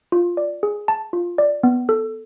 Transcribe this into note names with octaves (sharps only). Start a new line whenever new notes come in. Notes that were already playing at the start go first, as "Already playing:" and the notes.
F4
D5
G#4
A5
F4
D5
B3
A4